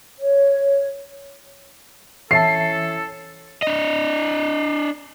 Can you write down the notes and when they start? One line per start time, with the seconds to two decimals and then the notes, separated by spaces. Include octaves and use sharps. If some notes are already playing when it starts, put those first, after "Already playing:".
0.19 C#5
2.31 E3 C#4 E4 A4 E5 A5 C7
3.62 D4 D#5